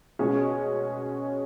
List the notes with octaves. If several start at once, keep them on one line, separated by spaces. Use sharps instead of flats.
B2 G#3 C#4 G#4 C#5